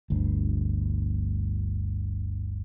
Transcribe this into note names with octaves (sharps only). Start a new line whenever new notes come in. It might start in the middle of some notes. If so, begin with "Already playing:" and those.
G1 D2